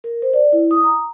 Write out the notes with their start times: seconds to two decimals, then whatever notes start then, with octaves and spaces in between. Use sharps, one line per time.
0.04 A#4
0.22 C5
0.33 D5
0.52 E4
0.71 D#6
0.84 A#5